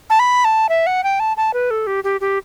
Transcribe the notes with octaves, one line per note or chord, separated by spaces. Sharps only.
A5
B5
A5
E5
F#5
G5
A5
A5
B4
A4
G4
G4
G4